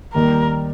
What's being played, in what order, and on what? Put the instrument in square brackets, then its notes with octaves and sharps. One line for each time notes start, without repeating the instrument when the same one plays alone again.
[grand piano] D#2 D#3 G3 [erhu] A#4